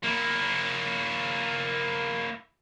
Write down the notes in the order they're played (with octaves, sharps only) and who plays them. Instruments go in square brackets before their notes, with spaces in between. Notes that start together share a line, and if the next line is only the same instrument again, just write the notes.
[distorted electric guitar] A#3 E4